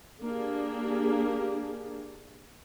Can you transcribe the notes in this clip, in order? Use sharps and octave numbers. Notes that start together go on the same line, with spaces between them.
A#3 D4 G4 G#4